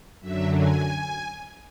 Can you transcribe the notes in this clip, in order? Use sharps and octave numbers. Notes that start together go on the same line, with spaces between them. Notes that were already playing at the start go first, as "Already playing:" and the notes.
F#2 D3 F#3 E5
G#5